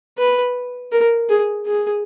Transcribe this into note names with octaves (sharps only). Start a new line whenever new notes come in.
B4
A#4
G#4
G#4